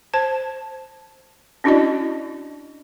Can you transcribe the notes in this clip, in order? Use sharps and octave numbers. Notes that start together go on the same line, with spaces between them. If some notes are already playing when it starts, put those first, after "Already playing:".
C5 A5
C#4 D4 E4 F#4 D5 D#5